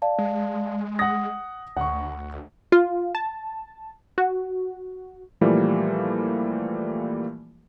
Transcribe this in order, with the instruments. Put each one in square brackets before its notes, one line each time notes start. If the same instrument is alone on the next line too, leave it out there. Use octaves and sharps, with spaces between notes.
[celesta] D5 F5 A5
[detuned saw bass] G#3
[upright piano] F#5 A#6 [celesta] D#6
[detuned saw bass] D2 [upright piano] F#5 C#6
[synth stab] F4
A5
F#4
[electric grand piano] A#2 E3 F3 G3 A3 A#3